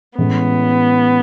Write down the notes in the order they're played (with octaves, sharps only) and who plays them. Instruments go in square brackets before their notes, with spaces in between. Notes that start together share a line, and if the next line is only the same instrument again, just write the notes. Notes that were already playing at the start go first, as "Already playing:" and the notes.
[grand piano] A2 E3 G#3 C#4 [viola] B3